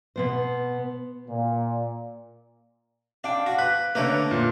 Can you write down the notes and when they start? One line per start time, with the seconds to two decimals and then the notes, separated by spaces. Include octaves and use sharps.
0.16 B2 B3 C5
1.28 A#2
3.24 D4 F5 G5
3.46 F#4
3.58 B4 F#6
3.95 D3 A3 A#3 A#4 B4 C#5
4.31 A#2